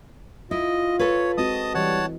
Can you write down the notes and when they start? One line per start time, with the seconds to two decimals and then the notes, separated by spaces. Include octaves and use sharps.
0.51 E4 F4 D#5
0.99 A4 B4 C#5
1.38 G#3 C4 F#4 D#5 A5 D#6
1.75 E3 G3 C#5 D#5 F#5 A5